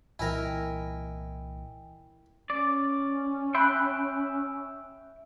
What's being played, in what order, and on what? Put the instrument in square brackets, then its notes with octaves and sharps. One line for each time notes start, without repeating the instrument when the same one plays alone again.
[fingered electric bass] C2 A#2 E3 [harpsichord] E4 A#4 [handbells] D#5 G5 G#5
[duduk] C#4 [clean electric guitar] D5
[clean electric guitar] E5 G5 [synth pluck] B5 F#6